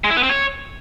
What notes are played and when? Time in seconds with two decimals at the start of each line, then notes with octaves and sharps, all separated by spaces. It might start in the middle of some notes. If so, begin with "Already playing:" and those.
0.04 G#3
0.10 E4
0.17 B3
0.23 C4
0.30 C#5